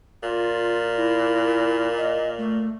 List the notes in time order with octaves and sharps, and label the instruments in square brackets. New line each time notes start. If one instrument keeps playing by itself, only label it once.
[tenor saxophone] A#2 [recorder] F4
[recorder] E4
D#5
A3